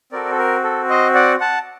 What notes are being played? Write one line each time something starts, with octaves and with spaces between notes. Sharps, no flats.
C4 F#4 A4 A#4 D5
A4
A#4
A4
C5 D#5
D5 F#5
F#5 A5